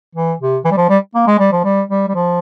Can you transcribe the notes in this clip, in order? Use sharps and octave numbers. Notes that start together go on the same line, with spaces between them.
E3
C3
E3
G3
F3
G3
A#3
G#3
G3
F3
G3
G3
G3
F3